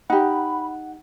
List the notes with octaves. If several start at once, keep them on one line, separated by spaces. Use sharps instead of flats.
D#4 G4 F#5 B5